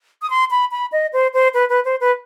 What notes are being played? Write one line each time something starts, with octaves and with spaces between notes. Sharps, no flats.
D#6
C6
B5
B5
D#5
C5
C5
B4
B4
C5
B4